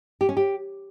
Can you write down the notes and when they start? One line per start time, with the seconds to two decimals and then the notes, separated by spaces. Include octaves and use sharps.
0.21 G4
0.29 C#4
0.37 G4